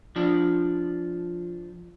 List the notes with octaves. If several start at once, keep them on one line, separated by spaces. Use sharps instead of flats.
F3 D4